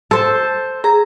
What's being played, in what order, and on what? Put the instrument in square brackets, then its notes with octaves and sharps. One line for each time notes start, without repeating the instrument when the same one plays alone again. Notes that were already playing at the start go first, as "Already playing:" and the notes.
[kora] A4 [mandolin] C5 A5
[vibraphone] G#4 [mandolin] A#5